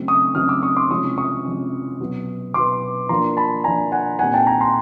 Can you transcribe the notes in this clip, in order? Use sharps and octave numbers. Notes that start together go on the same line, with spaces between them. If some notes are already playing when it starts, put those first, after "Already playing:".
Already playing: C#3 F#3 A3 C4 D#4
C#6 D#6
C#3 F#3 A3 C4 D#4 D#6 F6
D6 E6
C#6 D#6
C6 D6
C3 F3 G#3 C#4 C#6 D#6
C#6 D#6
C3 F3 G#3 C#4
B2 F#3 B3
B2 F#3 B3 C6 D6
F3 A#3 D4 A#5 C6
A5 B5
F3 A#3 D4 G#5 A#5
F#5 G#5
A#2 G3 C4 D#4 F#5 G#5
G5 A5
G#5 A#5
A#5 C6